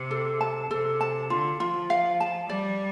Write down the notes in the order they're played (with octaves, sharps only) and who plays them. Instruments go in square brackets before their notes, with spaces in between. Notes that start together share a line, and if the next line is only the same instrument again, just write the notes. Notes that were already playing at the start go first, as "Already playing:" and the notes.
Already playing: [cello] C3
[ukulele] A4
A5
[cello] C3 [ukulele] A4
[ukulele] A5
[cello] D3 [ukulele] F4
[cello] F3 [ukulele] F4
[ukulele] F5
A5
[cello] G3 [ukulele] D5